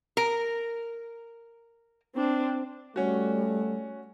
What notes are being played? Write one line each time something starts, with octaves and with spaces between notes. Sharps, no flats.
A#4
C4 D4
G3 A3 C#4 F#4